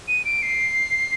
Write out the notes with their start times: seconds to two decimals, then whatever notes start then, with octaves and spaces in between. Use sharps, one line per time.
0.08 D#7
0.25 D7
0.42 C7